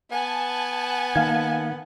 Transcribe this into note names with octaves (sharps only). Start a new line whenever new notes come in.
B3 G#5 A5
D#3 A#3 F5 G#6